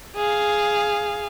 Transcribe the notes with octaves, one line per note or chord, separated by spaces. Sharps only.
G#4 F5